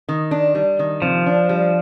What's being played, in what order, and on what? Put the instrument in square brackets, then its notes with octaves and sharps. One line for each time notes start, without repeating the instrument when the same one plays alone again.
[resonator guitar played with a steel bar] D#3
D4
G3
D#3
[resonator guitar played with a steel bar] C3 [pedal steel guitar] F3
[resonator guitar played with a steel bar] D4
G3